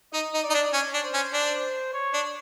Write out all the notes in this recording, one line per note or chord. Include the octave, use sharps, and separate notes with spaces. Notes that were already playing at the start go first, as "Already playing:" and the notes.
D#4 D#5
D#4
D5
D#4
D4
C#4 C#5
D4
C5
C#4
D4
C#5
D4